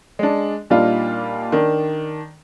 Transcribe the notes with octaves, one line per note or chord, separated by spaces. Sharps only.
G#3 D4
A#2 G3 D4 D#4 F4
D#3 D4